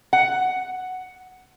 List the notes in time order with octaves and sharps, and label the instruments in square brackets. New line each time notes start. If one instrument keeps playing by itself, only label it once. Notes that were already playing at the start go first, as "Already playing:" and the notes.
[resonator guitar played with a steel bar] F#5